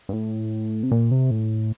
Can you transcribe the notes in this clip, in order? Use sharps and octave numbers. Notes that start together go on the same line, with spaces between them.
G2
A2
C3
A#2
C3
A2